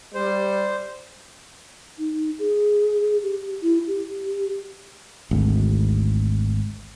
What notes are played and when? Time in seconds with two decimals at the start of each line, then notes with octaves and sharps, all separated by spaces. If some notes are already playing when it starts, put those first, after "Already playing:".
0.14 G3 C5
1.99 D#4
2.39 G#4
3.23 G4
3.62 E4
3.87 G4
5.31 G#1 D2